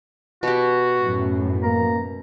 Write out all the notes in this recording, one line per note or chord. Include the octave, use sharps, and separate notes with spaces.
B2 F#4 G4
F#2 A2
A#3 A#5